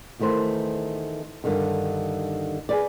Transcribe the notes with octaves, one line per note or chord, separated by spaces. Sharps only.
E2 D#3 A3 B4 C5
G2 D3 D#3
G#4 B4 D5